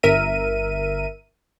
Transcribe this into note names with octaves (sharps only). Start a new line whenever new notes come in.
G1 A#4 E5 D#7